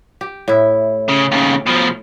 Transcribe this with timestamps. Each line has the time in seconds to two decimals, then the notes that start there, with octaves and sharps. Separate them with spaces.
0.21 G4
0.48 A2 E4
1.08 C#3
1.31 D#2 C#3
1.66 B2 F3